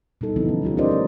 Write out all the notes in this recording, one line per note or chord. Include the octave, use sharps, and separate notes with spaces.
B2 G3 D#4 A4
D3 E3 F3 B3 D#4 E4
C#4
G3 B3 F4 G4
C#4 D#4 A#4 C5 D5 D#5
A3 C#4 F4